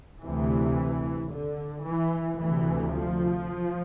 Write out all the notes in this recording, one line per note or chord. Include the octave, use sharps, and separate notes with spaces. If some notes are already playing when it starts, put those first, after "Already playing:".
D2 C3 E3
D3
E3
D2 C3 E3
F3